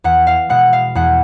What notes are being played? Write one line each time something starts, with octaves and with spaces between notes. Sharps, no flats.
E2 F#5
F5
B2 G#3 F#5
F5
E2 F#5